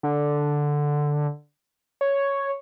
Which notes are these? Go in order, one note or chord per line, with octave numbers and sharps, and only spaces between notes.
D3
C#5